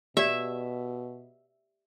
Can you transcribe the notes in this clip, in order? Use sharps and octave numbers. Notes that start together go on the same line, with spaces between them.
B2 G4 D5 E5